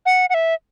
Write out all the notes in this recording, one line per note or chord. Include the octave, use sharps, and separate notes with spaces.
F#5
F#5
E5